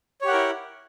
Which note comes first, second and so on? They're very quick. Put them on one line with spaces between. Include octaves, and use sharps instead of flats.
C#5 G4 F#5 A#4 E4